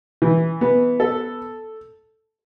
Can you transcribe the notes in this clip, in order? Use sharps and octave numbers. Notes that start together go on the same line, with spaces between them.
E3
B3
A4